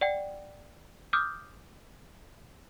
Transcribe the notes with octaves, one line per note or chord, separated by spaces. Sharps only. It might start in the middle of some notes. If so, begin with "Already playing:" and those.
D5 F#5 G5
D6 D#6 F6 G6